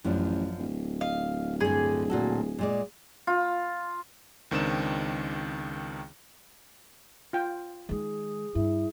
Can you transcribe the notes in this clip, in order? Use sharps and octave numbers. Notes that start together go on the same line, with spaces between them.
A1 F#2 F3 D4
D1
D#5 F5
G2 D3 G#4
A#2 F#4 A4
A#2 G#3 D5
F4
C#2 D#3 C4 D4 E7
F4 G5
D#3 G#3 G#4
G2 E4